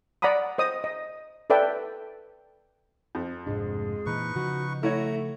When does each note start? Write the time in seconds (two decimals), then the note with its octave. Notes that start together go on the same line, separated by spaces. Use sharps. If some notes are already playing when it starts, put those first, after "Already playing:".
0.22 D5 F#5 A#5 B5 D#6
0.58 C5 D#5 D#6
0.84 D#5
1.50 A4 B4 D5 E5 G5
3.15 F2
3.47 F1 G#2 G#3 D4
4.06 A#2 E3 D#4 B4 C#6
4.36 C#3 F3 F#4
4.83 A3 E4 F#4 C#5 A#5